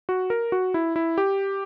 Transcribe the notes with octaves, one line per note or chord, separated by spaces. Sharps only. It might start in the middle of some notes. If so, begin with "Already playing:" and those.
F#4
A#4
F#4
E4
E4
G4